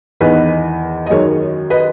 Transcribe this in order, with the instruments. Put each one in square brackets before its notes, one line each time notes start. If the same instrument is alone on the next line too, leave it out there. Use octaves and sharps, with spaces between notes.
[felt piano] E2 D#3 G#3 B4 D#5
D#5
F#2 D#3 G#3 A#4 C#5
B4 D#5